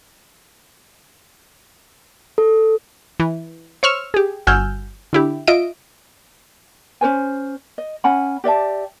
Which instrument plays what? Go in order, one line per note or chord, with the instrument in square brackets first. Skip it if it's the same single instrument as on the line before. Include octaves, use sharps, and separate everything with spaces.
[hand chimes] A4
[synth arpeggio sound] E3
C5 C#5 C#6 E6 F6
G4 G#4
G1 F#4 G#5 E6 F6 G6
D3 E4 G4
F4 D#5 E5 D7
[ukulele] C#4 A#4 C5 G#5
D#5
C#4 F#5 G#5 B5
G4 D5 E5 A5